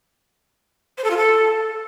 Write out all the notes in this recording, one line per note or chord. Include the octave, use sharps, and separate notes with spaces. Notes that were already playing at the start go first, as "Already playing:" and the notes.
C5
A4
F4
A4